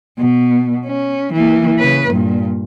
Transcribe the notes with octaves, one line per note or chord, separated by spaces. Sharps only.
B2
C#4
E3 A#3
C#3 B4
G2 A#2